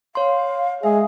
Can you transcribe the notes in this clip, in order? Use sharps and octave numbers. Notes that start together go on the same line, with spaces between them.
C#5 F5 C6
G#3 G#4 E5